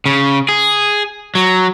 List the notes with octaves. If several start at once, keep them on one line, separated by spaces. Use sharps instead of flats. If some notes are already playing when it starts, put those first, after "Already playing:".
C#3
G#4
F#3